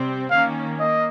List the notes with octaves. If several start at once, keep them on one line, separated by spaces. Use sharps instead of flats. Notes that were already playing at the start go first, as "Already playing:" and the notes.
Already playing: C3 G3 C4
D#3 A#3 C#4 F5
A#3 D#5